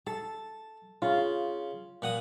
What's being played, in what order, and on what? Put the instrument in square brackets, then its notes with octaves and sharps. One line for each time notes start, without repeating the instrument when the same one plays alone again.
[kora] A4 [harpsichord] A5
[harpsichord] C#3 [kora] F4
[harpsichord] A#2 F#5 D#6